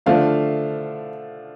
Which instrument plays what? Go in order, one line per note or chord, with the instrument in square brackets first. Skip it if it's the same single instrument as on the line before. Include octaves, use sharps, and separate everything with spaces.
[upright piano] D3 F3 A3 D4 F5